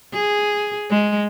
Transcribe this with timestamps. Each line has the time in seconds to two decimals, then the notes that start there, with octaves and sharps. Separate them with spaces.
0.13 G#4
0.90 G#3